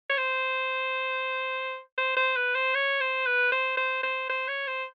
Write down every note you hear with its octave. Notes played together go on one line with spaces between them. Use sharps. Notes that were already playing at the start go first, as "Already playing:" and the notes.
C#5
C5
C5
C5
B4
C5
C#5
C5
B4
C5
C5
C5
C5
C#5
C5